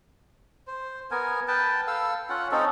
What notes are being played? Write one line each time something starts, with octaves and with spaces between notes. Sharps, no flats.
C5
B3 A#4 G#5
B4 G5 A5
A4 F5 E6
C#4 F4 F#5
C4 C#4 D#4 A4